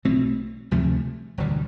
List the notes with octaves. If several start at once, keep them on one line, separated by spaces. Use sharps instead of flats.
B1 B2 A3 C4
D2 C3 F3 A3
E1 D2 D3 G3